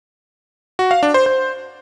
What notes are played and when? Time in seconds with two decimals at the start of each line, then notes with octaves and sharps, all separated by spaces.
0.79 F#4
0.91 F5
1.03 D4
1.14 C5
1.26 C5